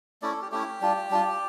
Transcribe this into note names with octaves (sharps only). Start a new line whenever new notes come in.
A3 C#4 E4 D5
A4
G4
A3 C#4 E4 G4
G3 D4 F4
G3 D4 F4